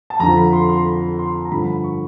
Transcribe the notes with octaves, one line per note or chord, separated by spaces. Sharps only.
A5
F2 D3 F3 A#5
B5
C6
C6
B5
C6
A#5
G2 D3 F3 B5
B5
C#6